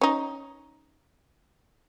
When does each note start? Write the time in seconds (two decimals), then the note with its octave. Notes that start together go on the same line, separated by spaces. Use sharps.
0.01 C#4 D#4